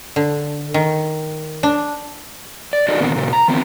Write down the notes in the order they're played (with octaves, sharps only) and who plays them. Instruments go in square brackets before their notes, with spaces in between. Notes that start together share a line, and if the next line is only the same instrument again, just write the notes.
[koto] D3
D#3
D4
[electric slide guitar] D5
D#4 F#4 A4 D5 D#5
A#2 D3 D#3 B3 C4
A#2 C#3
A#5
D#3 B3 C4